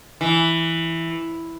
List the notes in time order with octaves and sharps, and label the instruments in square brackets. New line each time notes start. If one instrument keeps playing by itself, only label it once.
[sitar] E3